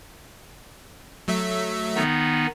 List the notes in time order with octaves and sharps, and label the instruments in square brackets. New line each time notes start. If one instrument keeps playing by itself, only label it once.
[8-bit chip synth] F#3 A3 E5
[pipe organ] D#3 B3 D#4